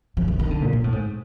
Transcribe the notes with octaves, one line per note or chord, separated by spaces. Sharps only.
F3
E3
D#3
D3
A#2
A#2
A2
G#2